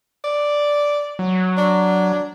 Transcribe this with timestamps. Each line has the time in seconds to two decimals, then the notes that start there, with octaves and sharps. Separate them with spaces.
0.24 D5
1.19 F#3
1.57 D4